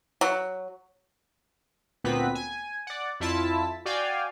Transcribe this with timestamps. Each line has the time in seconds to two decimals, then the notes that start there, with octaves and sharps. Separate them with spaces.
0.21 F#3
2.04 D2 A#2 B3 C4 B4 B6
2.35 G#5
2.87 D5 F#5
3.20 F2 E4 F4 A5 B6
3.85 F#4 D5 F5 G5 G#5